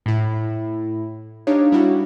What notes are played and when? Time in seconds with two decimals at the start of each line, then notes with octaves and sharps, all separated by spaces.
0.06 A2 E4
1.47 D4 D#4 G4 C#5 F5
1.72 G3 E4 F#4